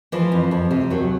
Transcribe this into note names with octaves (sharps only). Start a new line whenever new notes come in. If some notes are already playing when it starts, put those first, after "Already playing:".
E3 F3
F2
F2
C3
D#2 F#3